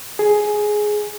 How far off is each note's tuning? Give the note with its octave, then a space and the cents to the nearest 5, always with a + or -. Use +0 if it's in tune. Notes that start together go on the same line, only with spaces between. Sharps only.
G#4 +10